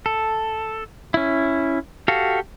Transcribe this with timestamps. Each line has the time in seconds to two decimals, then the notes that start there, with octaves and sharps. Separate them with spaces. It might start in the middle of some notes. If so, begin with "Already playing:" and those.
0.06 A4
1.14 C#4 E4
2.08 F#4 G4 A4 F5